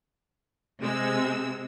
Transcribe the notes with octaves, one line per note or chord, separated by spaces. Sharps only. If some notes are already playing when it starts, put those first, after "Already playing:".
C3 G#3 E6